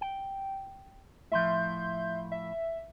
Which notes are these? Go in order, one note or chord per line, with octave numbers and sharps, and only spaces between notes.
G5
A2 F3 E5 C6 G6
E5